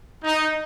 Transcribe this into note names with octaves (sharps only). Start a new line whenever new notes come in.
D#4